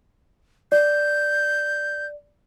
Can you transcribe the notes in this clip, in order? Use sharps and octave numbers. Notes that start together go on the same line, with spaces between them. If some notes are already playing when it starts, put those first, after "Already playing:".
D5 G6